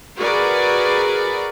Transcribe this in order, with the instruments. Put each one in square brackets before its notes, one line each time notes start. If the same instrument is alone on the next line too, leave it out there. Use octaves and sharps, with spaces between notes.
[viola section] F#4 G#4 A#4 B4 D5